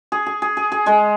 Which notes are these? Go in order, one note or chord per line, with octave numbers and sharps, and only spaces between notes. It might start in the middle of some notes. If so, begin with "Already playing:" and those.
G#4
G#4
G#4
G#4
G#4
G#3 G#4